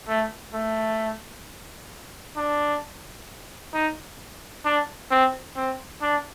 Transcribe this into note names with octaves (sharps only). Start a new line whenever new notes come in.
A3
A3
D4
D#4
D4
C4
C4
D4